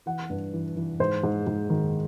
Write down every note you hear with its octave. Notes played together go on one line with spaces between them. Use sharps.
E3 F#5
G2
E3
E3
G#2 C5
G#2
G#2
D#3